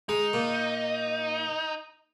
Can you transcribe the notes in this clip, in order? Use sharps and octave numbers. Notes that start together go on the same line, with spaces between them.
G#3 D#4
A#2